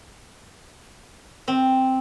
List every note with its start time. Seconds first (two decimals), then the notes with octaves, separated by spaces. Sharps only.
1.48 C4